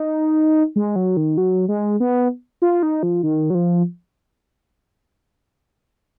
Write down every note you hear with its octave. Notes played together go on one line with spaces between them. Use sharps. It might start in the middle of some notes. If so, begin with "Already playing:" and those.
Already playing: D#4
G#3
F#3
D#3
F#3
G#3
B3
F4
D#4
F3
D#3
F#3
F3